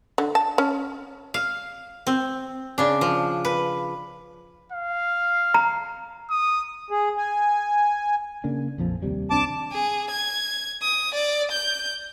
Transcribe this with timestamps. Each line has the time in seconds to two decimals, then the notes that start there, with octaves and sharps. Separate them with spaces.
0.18 D3
0.35 A5
0.58 C#4
1.34 F5
2.07 C4
2.78 C#3 D4
3.01 F3
3.45 B4
4.72 F5
5.54 A#5
6.30 D#6
6.91 G#4
7.17 G#5
8.44 C#3 A#3 D4
8.78 A#1 F2 F3
9.02 D#2 C3 G3
9.30 C2 C4 D4 A5 D6
9.72 G#4
10.10 G#6
10.83 D#6
11.14 D5
11.51 G6